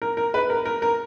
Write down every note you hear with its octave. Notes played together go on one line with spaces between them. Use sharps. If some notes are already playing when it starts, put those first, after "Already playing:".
A#4
A#4
B4
A#4
A#4
A#4